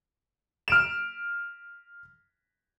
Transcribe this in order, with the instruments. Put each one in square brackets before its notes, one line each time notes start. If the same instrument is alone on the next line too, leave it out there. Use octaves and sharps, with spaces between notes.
[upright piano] F6 D7 E7